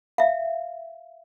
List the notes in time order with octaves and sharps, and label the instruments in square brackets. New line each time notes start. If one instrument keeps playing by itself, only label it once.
[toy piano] E5 F5